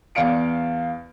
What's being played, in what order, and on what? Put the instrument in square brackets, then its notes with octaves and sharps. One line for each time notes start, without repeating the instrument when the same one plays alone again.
[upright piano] E2 D5 F5 C#7 D7